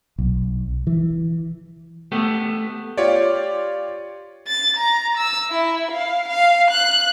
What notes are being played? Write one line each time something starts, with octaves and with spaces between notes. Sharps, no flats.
B1
E3
A3 B3 G4
F4 G4 C#5 D5
A6
A#5
E6
E4
F5
F5
F#6